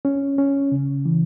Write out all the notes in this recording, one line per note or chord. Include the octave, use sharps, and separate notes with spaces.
C#4
C#4
C#3
E3